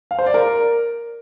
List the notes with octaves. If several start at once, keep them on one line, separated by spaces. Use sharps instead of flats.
F5
C5
D5
A#4